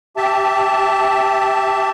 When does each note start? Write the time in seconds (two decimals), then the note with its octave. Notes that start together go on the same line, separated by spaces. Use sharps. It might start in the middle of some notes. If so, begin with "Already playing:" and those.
0.17 G4 E5 A5